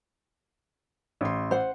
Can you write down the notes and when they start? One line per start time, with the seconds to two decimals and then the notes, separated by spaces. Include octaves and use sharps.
1.21 A1 C6
1.51 C5 F#5